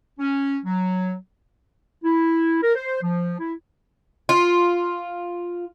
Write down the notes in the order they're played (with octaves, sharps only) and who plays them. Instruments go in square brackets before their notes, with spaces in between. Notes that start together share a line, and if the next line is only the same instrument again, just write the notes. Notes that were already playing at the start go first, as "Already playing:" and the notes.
[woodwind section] C#4
F#3
E4
A#4
C5
F3
E4
[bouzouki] F4